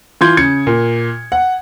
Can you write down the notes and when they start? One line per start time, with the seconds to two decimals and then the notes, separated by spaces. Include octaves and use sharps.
0.21 E3 F4 C6 G6 G#6
0.37 C#3 G#6 C#7
0.67 A#2
1.32 F#5